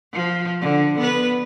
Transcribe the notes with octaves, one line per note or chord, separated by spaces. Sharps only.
F3
D3
B3 B4